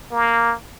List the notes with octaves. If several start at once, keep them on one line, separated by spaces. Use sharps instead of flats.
A#3